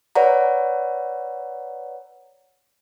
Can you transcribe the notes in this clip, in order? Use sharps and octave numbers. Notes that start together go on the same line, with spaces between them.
B4 C#5 D5 F#5 A#5